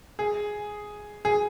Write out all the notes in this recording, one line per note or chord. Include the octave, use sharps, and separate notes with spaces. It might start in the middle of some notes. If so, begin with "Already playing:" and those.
G#4
G#4